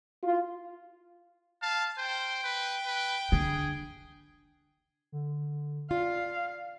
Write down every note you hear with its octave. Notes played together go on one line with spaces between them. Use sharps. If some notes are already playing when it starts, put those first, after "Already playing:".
F4
F5 A5
C5 G5
B4
B4
D3 G#4
D3
F4 D5 F5